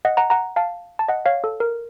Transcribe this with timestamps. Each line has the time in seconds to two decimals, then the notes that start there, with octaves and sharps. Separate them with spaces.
0.05 D#5 F#5
0.17 F#5 A#5
0.30 F#5 A#5
0.56 F5 A5
0.99 A5
1.08 D#5 F#5
1.26 C#5 F5
1.44 A4
1.60 A#4